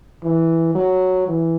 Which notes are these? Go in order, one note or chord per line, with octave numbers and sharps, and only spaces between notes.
E3
F#3
E3